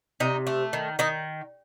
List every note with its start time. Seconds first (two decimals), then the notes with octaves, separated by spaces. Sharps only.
0.20 C3 D#4
0.47 A3
0.73 D#3
0.99 D#3 D#4